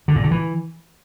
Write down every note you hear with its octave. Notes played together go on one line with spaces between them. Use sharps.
D3
A#2
D3
E3